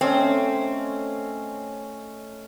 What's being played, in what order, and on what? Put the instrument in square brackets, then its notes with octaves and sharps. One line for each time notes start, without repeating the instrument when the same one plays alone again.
[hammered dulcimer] A3 C#4 D#5 [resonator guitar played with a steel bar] C4